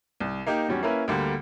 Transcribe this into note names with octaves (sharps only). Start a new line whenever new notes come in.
C2
A#3 D#4 G4
E2 F#3 G3 C#4
A#3 C#4 E4 A#4 B4
D2 D3 G3 A#3